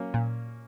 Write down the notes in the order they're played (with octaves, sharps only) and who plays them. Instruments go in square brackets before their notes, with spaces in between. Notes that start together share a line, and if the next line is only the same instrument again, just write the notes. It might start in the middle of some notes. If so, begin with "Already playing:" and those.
Already playing: [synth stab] F#3 [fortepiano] A#3 C#4
[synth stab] A#2